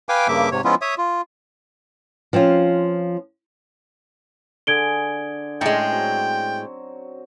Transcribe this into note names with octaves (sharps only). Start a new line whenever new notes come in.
B4 F5 G5 G#5 D6
G2 C#3 A#3 E5 D6
G#2 C3 C#5
F3 G#3 B3 C#4 E4 F4
C#5 E5 D#6
F4
F3 C4 C#4 F4
D3 G#4 G#6 D7 G7
A2 G#3 C#4 G5 C6
F#3 C4 C5